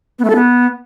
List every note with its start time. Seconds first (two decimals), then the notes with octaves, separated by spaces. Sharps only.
0.19 B3
0.24 A3
0.30 A4
0.35 B3